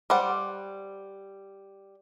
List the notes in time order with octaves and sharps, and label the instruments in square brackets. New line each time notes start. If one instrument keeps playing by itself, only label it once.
[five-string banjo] G3 C5 D5 F#5